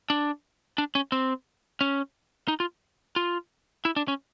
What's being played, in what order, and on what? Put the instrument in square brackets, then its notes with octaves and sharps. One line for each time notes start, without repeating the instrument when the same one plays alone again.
[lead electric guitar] D4
D4
C#4
C4
C#4
D#4
F4
F4
E4
D4
C#4